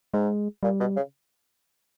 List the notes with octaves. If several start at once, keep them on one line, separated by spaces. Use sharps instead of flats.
G#2 G#3
A#2 G3
B2
C#3